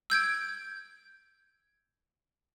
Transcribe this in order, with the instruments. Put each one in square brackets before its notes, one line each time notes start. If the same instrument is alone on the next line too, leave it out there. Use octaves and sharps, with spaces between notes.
[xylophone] E6 G6 G#6 D7